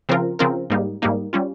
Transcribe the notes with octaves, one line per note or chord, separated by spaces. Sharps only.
C#3 F3 C4 F4 A#4
C#3 F3 C4 F4 A#4
G#2 G3 A#3 D#4
G#2 G3 A#3 D#4
G3 C#4 F4